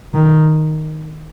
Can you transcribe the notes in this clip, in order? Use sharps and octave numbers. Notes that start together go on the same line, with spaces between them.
D#3